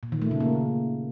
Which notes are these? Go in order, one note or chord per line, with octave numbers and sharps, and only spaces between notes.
A#2
D#3
A3
C#3
A#3